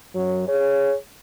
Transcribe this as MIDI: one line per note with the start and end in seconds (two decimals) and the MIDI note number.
0.14 0.46 42
0.14 0.46 54
0.48 0.94 68
0.48 0.94 73